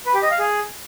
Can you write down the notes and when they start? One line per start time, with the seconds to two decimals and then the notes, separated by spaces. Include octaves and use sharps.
0.06 B4
0.14 G4
0.23 D#5
0.31 F5
0.39 G#4